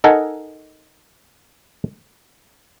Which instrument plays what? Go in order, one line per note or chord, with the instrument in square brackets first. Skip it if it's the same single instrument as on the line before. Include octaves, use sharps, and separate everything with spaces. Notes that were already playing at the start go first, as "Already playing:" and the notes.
[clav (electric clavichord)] D#4 A4 A#4 D#5 F#5 G#5